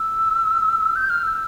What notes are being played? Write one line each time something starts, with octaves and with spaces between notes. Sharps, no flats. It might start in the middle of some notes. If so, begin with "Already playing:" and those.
Already playing: E6
G6
F6
E6